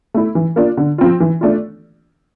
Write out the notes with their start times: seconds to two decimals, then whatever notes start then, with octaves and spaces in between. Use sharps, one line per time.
0.14 A3 E4
0.35 E3
0.56 A#3 D4 F4
0.77 D3
0.98 F3 C4 F4
1.20 E3
1.41 A3 D4 F4